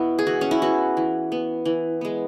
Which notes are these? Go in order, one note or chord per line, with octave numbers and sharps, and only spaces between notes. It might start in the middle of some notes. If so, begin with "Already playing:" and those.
Already playing: B2 B3 E4 F#4
G#4
E3 F#4
C#4
E4
B3 F#4
E3
B3
E3
G#3 B3